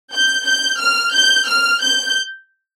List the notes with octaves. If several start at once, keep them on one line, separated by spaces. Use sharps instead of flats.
G6
G6
F6
G6
F6
G6